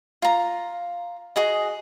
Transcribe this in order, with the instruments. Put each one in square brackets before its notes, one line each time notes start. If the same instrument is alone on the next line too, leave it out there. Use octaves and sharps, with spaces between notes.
[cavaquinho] F4 A#5
F#4 G#4 D#5